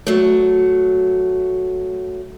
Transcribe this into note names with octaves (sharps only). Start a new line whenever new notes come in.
F#3 A3